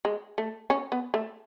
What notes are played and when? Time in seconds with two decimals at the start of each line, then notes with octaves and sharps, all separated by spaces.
0.05 G#3
0.38 A3
0.70 C#4
0.92 B3
1.14 A3